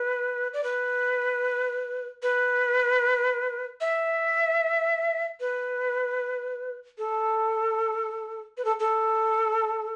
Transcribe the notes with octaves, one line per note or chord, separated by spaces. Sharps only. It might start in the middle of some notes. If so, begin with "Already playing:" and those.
Already playing: B4
D5
B4
B4
E5
B4
A4
B4
A4
A4